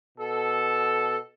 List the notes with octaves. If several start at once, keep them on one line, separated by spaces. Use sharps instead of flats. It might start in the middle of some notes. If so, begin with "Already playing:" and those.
B2 A4